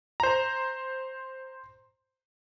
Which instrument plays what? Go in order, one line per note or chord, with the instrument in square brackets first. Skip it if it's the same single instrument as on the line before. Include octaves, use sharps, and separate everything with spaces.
[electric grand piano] C5 A#5